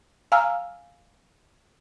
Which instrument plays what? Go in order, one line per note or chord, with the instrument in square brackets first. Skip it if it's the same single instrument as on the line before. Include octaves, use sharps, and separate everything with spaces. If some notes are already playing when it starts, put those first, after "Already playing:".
[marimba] F5 G#5 A#5 E6 F6